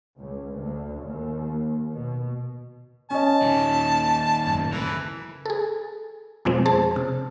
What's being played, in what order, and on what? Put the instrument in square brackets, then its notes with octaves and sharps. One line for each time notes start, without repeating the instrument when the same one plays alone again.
[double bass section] C#2
D2
D#2
B2
[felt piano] C#4 D#5 [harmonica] A5
[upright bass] D#2 [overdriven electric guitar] A#2 D#3
[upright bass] F#2 A2
[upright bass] C#3 [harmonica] E3 [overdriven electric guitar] A#4 B4
[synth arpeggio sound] G#4 A4
F2 B2 F3 G#3 C4
G#4 C5 A5
C3